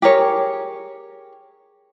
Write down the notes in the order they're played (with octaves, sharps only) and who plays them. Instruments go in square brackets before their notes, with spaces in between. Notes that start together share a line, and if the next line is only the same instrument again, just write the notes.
[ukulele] G4 G#4 A#4 C#5